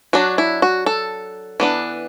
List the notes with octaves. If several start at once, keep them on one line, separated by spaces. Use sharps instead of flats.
F#3 D4 F#4
E4
F#4
A4
E3 B3 D4